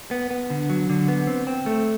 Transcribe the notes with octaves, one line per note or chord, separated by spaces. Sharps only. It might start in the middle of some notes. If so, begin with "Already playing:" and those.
B3
B3
D3
F#3
D3
B3
C4
C4
A3